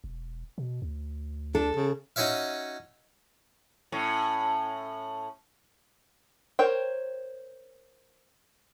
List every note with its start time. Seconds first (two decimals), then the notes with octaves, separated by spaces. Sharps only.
0.04 E1
0.58 B2
0.82 D2
1.55 D4 A4
1.76 C#3
2.16 C#4 D#4 F#4 C#5 E5 F5
3.92 A2 C#4
6.59 A#4 C5 C#5 G5